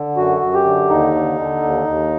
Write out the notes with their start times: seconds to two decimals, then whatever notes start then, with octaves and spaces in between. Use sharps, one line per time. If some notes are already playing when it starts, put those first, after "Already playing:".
Already playing: D3
0.16 F#2 F#4
0.41 F#2
0.53 G4
0.65 D3
0.89 D#2 D#4
1.15 D3
1.39 D3
1.63 D#2
1.87 D#2